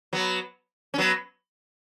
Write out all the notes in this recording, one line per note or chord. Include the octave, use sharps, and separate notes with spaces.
F#3 B3
C#4
F#3 B3